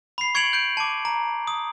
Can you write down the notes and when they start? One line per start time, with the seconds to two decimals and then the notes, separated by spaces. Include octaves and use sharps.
0.18 B5 C7
0.35 C#6 G#6 C#7 D7 F7 F#7
0.53 G6 D7
0.77 A5 D6
1.05 A#5
1.47 D#6